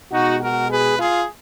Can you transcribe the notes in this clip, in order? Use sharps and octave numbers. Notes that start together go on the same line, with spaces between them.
B2 G#3 D#4 F#4
F#4 A#4
G#4 B4
F4 G#4